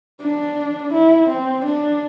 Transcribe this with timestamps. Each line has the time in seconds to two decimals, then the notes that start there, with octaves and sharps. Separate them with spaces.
0.21 D4
0.92 E4
1.29 C4
1.65 D4